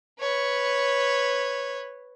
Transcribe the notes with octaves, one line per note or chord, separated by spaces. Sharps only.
B4 C#5